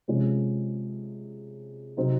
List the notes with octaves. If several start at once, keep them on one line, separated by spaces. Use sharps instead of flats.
C3 F3 G#3 C#4
C3 F#3 C4 D#4